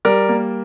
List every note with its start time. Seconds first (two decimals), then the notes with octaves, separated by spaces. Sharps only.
0.05 G3 A#4 D5
0.29 A#3